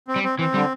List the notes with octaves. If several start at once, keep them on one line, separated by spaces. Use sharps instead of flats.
C4
G3
C4
E3 C4
D3 G3